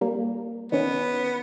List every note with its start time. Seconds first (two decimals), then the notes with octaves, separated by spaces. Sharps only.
0.01 G3 A#3
0.72 D#3 B3 C#4